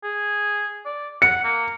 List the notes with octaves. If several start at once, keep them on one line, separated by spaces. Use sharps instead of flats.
G#4
D5
F#5 C#7
A#3